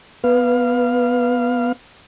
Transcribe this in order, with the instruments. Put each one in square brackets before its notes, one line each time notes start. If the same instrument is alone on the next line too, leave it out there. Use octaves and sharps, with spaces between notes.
[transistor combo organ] B3 F5 [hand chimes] B4